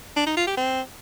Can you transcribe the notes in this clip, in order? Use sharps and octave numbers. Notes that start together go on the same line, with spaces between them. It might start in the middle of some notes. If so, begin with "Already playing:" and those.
D4
D#4
F4
G4
C4